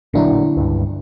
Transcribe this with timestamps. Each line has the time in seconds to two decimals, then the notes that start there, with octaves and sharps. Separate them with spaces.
0.14 A1 A#2 D3 F#3 D4 E4
0.57 C#2 G2